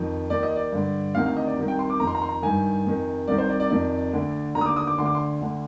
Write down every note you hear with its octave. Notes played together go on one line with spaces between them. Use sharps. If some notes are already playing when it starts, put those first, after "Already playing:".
Already playing: F2 D#3
D#2 D#3 D5
D#5
D5
G2 D3
D2 C3 D#3 F5
F5
D#5
D5
C2 C3 D#3
G5
C6
D6
F2 D#3 A#5
C6
A#5
C6
A#5
G2 D#3 G#5
F2 C3 D#3
C2 C3 D#3 D5
C5
D5
D5
F2 C3 D#3 D5
D2 D3
D#2 D3 A#5
D#6
D6
D#6
D6
D2 D3 C6
D6
C6
D2 D3